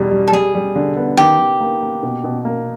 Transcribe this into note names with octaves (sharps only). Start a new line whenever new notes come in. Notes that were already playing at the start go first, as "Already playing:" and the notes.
Already playing: E2 B2 G3
G3
A4
G3 G#4
G3
D3
B3
D#3 G4
D#3
A#3
A#3
B2
B2
A#3